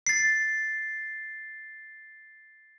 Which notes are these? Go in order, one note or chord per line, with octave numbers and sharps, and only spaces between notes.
A6 C7